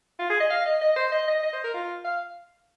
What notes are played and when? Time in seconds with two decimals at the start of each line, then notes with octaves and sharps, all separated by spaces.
0.19 F4
0.30 G#4
0.40 D#5
0.50 F5
0.65 D#5
0.81 D#5
0.96 C5
1.12 D#5
1.28 D#5
1.43 D#5
1.53 C5
1.64 A#4
1.74 F4
2.04 F5